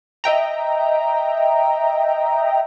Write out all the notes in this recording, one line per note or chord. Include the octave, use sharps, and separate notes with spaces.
D#5 E5 G5 A#5